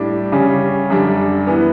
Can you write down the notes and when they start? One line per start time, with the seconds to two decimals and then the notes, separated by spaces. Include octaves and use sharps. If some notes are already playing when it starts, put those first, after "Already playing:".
Already playing: A2 G3 D4
0.32 C#3 G3 C#4
0.90 F#2 D3 G3 D4
1.47 E3 B3